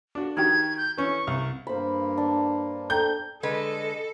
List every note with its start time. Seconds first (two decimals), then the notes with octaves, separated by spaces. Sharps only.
0.15 D4 F#4
0.37 D#3 F#4 G4 G#6
0.77 G6
0.97 E3 C#4 C#6
1.27 C2
1.67 G2 A#3 C5 B5
2.17 D4
2.90 A4 G5 A#5 G6
3.43 D3 G#3 A4 B4 D#5